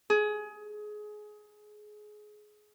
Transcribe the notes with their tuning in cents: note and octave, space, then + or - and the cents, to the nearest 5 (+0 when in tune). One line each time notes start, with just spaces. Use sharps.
G#4 +20